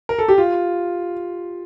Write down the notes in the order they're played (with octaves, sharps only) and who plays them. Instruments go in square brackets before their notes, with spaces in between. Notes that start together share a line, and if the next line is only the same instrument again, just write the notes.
[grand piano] A#4
A4
G4
F4